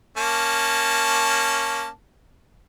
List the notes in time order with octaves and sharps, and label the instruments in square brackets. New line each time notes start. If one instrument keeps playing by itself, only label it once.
[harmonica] A#3 C#4 A5